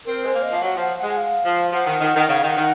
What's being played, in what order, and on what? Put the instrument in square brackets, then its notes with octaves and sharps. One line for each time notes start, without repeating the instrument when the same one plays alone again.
[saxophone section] C4 [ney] A#4
[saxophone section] G#3 [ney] C5
[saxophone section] A#3
[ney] D#5
[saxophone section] F3 [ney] F5
[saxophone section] F#3 [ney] F#5
[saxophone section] F3 [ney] F#5
[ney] F#5
[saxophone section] G#3
[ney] F#5
F5
[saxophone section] F3
[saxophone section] F3 [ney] F#5
[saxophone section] D#3
D#3
D#3
[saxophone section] C#3 [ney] F#5
[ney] F5
[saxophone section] D#3 [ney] F#5
[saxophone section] D#3